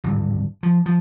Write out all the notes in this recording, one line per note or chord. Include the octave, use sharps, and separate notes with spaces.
D1 G#1 G2
F3
F3